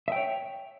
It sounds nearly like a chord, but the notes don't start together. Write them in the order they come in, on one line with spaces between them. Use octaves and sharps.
E5 G5 C#5